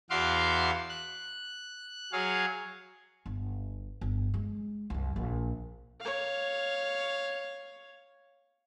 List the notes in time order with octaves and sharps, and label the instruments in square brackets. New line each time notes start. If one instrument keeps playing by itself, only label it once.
[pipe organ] E2 F#4 E5 F5 C6 D6
F#6
F#3 G#4 C#5 F5
[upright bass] G1
G1
G#3
C2 F#2
A#1
[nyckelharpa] C#5 F5